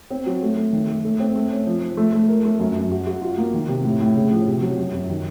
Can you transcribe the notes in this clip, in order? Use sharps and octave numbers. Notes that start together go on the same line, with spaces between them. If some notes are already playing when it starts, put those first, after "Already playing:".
C4
F#3
A3
A3
D#3
A3
A3
C4
A3
C#4
F3
F3
A3
A3
A#4
A3
F#2
F#2
F#4
F#4
F4
A#3
D#3
C3
A2
A2
C#3
F3
C3
F#3
F#2
F#2
D#3